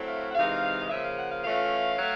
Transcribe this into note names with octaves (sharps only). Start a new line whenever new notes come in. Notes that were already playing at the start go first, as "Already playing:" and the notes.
Already playing: F#3 A3 C4 E4
F5
F#5
C3 E3 G#3 C4 D#4 F5
D#5
C#3 F3 A#3 E5
F5
F#5
F5
E3 A3 C#4 F4 F5
F#3 A3